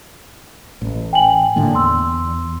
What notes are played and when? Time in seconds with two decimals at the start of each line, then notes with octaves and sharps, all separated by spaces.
0.81 A1
1.13 G5 G#5 F#7
1.56 A2 D3 A#3
1.75 E2 C6 E6